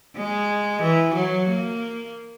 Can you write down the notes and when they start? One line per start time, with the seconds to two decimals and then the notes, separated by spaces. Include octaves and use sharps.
0.16 G#3
0.82 E3
1.14 F#3
1.48 A#3